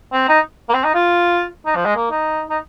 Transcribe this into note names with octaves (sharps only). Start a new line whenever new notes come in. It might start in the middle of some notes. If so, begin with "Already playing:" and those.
C4
D#4
A#3
C4
D#4
F4
D#4
F3
G#3
A#3
D#4
D#4